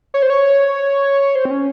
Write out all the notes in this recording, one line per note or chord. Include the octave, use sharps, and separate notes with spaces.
C#5
C5
C#5
C5
C4
C#4